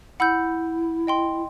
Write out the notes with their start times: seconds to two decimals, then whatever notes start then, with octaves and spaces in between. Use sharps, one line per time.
0.20 E4 F#5 B5 E6 G6
1.07 D#5 G5 C6